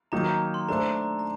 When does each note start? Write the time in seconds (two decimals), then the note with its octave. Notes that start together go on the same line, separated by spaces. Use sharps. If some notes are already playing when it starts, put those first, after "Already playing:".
0.12 D#3 F#3 A#3 D#4 A#5
0.54 C6
0.69 A3 D4 A4 C5 A#5
0.96 A#5
1.19 A#5